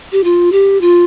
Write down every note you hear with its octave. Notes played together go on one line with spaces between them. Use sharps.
G4
F4
G4
F4